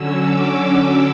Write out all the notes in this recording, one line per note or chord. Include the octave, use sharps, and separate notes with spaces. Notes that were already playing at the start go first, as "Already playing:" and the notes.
Already playing: D3 F#3 C#4 E6
D6